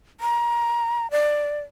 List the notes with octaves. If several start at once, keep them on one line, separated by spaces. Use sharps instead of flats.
A#5
D5